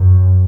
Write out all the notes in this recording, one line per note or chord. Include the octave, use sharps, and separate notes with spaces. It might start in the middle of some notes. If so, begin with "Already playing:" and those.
Already playing: F#2